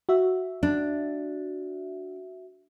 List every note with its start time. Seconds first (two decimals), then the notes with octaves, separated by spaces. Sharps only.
0.09 F#4 E5
0.63 D4